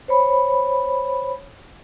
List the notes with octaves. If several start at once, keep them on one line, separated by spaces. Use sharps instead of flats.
C5 C#5 B5